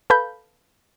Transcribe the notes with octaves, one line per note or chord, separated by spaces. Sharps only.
A4 B4 F5 B5 G6